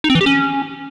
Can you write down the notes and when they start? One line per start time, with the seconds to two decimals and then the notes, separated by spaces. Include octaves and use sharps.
0.04 D#4
0.10 C4
0.15 E3
0.21 G4
0.26 C#4